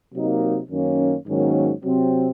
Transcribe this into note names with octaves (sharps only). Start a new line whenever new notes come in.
C3 F#3 A#3 D#4
F#2 D#3 A#3 C#4
G#2 D#3 F#3 A#3 C#4
C3 F#3 C4